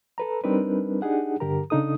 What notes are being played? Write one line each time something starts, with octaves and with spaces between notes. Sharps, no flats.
A4 B4 A#5
G3 C4 D4 D#4 A#4 B4
D4 D#4 G4 G#4 F#5
G2 D3 G4 A#4 A#5
C#3 D4 D#4 A4 D#6